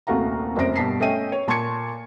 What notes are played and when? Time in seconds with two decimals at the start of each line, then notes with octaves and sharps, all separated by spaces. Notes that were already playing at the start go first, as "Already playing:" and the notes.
0.07 D#1 C2 A3 F#4 F5 A#5
0.56 F1 F#2 C5 A#6 D7
0.76 G2 B2 A5 B6 C7
1.00 A3 C#4 D#5 E5 G5 D#7
1.32 C#5
1.48 A#2 A5 C6 C#6 G#6 C#7